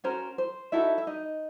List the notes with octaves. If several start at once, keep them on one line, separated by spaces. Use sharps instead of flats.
C#4 F#4 A#4 C5
C5
D#4 E4 F#4 A4 E5
E5
D#4 D#5